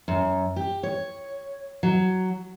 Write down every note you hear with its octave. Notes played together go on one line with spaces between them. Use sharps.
F#2
G4
C#5
F#3